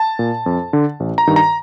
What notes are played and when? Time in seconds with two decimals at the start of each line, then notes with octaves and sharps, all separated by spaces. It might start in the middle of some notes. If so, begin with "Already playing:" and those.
Already playing: A5
0.19 A#2
0.46 F2
0.73 D3
1.00 A1
1.18 A#5
1.27 G2 D#3
1.36 A#5